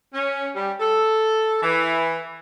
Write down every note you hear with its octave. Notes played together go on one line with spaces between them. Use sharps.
C#4
G3
A4
E3